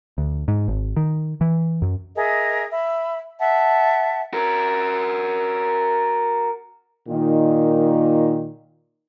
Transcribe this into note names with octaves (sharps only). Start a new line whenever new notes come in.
D2
G#2
G#1
D#3
E3
F#2
G#4 A#4 D#5 E5
E5 B5
E5 F#5 A5
F#4 A#4
A#2 D#3